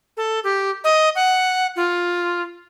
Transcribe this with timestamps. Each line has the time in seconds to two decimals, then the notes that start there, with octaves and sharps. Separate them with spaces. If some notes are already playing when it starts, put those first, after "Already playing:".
0.17 A4
0.44 G4
0.84 D#5
1.15 F#5
1.76 F4